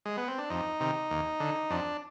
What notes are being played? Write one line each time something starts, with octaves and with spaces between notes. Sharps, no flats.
G#3
B3
C4
D4
F2 D#4
C3 D#3
D#2
D3
F2 D4